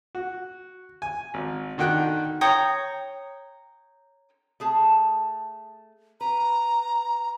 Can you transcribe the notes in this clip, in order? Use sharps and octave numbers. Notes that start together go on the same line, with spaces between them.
F#4
G#5
G#1
D3 D#3 F#4 G5 F#6
C#5 G5 A#5 D#6
A3 G#4 A5
B4 A#5